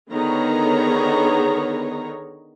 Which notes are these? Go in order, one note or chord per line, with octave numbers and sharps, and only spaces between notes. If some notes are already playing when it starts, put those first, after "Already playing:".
D3 D#3 B3 G#4 C#5 A#5